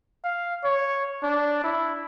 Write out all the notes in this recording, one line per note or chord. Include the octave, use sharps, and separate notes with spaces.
F5
C#5
D4
E4